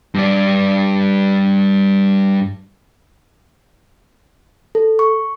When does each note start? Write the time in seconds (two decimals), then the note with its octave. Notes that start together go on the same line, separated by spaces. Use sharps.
0.15 G2 D5
4.75 A4
4.99 C#6